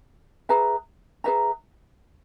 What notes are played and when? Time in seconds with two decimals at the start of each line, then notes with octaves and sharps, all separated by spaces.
0.49 G#4 B4 E5 A#5
1.24 G#4 B4 E5 A#5